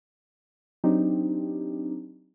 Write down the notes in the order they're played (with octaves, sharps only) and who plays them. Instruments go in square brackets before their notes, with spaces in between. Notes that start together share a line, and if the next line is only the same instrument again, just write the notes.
[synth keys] F#3 C4 D4 D#4 G4